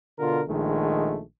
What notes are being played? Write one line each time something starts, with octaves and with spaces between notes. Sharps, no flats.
B2 D3 F4 A#4
A#1 D#3 G#3 A3